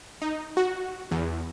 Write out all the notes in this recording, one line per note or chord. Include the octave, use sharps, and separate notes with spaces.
D#4
F#4
E2